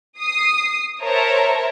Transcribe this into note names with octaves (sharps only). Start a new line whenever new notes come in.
D#6 C7
A#4 C5 C#5 E5 A5 A#5